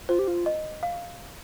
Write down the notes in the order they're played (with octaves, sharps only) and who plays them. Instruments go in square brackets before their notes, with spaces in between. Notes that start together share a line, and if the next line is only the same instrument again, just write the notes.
[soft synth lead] F4 [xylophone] C5
[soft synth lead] G4
F4
[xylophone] D#5
F5